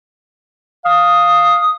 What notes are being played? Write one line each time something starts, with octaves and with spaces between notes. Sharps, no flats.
F5 D#6